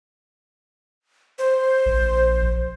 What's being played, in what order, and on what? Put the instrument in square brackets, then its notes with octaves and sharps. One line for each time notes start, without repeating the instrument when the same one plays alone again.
[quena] C5
[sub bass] A#1